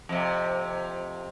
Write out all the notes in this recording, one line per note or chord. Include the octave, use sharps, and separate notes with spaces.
F2 C3